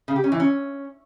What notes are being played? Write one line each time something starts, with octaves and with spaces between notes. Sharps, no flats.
C#3
G4
C#4
E3
C#4